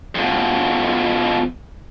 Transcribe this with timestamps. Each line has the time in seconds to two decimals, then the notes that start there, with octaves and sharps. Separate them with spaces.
0.15 F2 B2